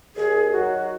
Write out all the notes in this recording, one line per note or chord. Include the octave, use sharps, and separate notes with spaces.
D#2 G#4
D#3 F#3 F#4